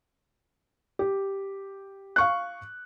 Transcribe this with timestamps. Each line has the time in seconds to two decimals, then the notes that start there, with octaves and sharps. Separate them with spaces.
0.99 G4
2.16 F5 C#6 F#6